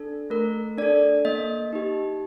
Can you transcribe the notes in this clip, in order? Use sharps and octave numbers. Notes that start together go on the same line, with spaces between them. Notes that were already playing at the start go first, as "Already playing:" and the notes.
Already playing: D4 A4
A3 A#4
D4 A4 D5
A#3 D#5
D#4 G4